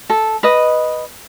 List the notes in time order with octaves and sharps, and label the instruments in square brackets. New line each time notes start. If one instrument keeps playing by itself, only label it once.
[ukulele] A4
B4 D#5